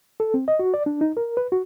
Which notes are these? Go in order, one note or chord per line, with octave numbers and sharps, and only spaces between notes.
A4
C4
D#5
F#4
D5
D4
D#4
A#4
B4
F#4